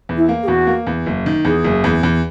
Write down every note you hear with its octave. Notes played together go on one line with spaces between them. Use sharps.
E2
E4
A#3
G#4
E2 F#4
A#3
E2
F#1
D#3
E2 G#4
F#1
E2
E2